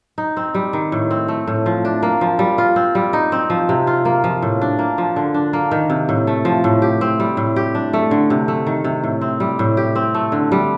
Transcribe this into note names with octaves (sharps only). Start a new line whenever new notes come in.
D#4
C4
G3
D#3
A2
C4
A3
A2
F3
D4
A#3
F3
G3
F4
C4
G3
D#4
C4
F3
C3
F4
A#3
F3
A2
D4
A#3
F3
D3
D4
A#3
D#3
C3
A2
A3
F3
A2
G4
C4
G3
A2
G4
D4
A3
D3
C3
A3
D#3
C3
A2
C4
G3
A2
G4
C4
A3
D3
G3